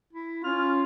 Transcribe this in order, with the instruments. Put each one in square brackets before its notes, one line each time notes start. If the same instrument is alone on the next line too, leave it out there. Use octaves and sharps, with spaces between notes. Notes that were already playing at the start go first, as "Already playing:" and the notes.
[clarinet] E4
[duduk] C#4 [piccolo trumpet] F4 [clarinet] F6